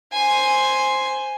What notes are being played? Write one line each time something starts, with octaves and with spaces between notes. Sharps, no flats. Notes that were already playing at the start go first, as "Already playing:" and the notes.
C5 G#5